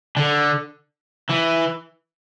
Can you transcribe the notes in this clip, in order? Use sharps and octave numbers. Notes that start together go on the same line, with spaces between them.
D3
E3